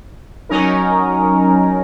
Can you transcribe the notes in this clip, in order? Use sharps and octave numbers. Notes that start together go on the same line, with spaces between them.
F#3 C#4 D#4 A#4